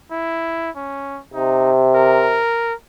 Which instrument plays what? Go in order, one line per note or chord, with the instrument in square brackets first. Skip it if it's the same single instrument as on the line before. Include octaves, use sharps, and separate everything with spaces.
[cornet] E4
C#4
[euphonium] C3 [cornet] D#4
[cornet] A#4